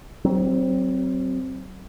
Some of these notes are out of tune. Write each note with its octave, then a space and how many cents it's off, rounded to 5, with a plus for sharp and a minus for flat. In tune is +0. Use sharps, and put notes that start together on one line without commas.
F#3 +30 C4 +0